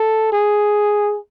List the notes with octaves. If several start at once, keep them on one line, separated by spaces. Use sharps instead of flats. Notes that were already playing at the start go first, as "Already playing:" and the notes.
Already playing: A4
G#4